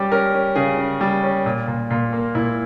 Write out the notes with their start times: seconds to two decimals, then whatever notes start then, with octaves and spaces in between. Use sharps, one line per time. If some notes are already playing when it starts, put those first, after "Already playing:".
Already playing: G3 C#4 G4
0.12 C#4 A#4
0.34 C#4
0.56 C#3 G#4
0.78 C#3
1.01 G3
1.23 C#4
1.46 A#2
1.68 A#2
1.90 A#2
2.13 A#3
2.35 A#2 E4